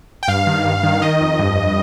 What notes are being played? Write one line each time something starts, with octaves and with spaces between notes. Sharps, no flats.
G5
G2 F5
D#3
G2
D#3
D#3 D#5
F2
G2